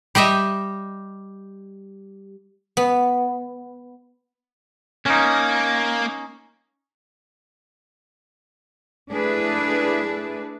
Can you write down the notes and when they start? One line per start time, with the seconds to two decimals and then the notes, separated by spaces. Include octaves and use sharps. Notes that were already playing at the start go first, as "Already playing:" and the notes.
0.15 G3 G4 D#5 E5
2.77 B3
5.06 A#3 C#4 D#4
9.11 A3 D4 E4 G#4 A4 B4